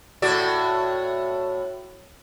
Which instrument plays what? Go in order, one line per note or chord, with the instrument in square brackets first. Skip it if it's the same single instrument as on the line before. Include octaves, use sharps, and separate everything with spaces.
[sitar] A2 F#4 D5